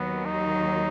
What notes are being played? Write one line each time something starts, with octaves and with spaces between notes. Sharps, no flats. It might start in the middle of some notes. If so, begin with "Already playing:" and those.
Already playing: D#2 D#3 F#3 B3
D#4